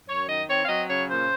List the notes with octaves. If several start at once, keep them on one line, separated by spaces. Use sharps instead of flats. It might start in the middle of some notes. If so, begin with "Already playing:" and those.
F#2 C#5
D#3 D#5
C4 C#5
F5
F#3 D#5
C#3 C#5
A#2 C5